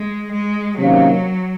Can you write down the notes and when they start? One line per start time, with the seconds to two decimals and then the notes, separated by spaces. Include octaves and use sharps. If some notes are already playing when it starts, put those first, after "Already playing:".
Already playing: G#3
0.32 G#3
0.77 C3 D#3 F#3 A#3 C#4